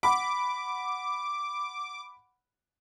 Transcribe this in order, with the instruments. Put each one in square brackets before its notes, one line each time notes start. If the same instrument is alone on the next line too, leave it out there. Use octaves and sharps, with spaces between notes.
[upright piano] F#5 B5 [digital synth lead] D6